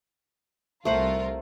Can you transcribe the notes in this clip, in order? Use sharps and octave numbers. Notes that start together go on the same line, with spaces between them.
C2 A3 F4 A#4 C5 F#5